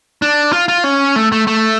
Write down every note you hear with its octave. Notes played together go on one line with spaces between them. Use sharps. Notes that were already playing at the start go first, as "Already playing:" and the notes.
D4
F4
F4
C#4
A3
A3
A3